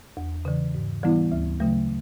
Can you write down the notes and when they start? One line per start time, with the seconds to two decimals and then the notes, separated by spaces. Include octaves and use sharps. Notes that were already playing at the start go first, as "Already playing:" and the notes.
0.17 E2
0.45 C#3 E3
0.74 G#2
1.03 E3 G3 B3 E4
1.32 D2
1.60 C#3 F#3 A3